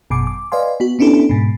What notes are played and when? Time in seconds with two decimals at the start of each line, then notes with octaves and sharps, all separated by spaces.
0.10 G#1 F#2 B2 G#5 D6
0.27 D6
0.52 B4 D5 D#5 F5 G#5 C6
0.80 B3 F#4
0.99 B3 C#4 D4 E4 G4 A4
1.29 G#2 B2